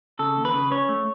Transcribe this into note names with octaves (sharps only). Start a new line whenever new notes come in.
C#3 A4
D#2
B4
C#3
C#4 C#5
A3